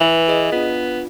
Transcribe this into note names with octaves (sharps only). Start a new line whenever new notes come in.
E3 B4 E5
G#4 D#5
B3 D4 F4